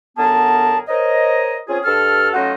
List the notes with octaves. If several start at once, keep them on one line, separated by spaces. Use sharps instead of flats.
F#2 D3 B3 G#4 A#4 A5
A#4 C5 C#5 D#5
C4 C#4 F4 G#4
G2 A4 F6
F#3 A3 C#4 D#4 F4 F#4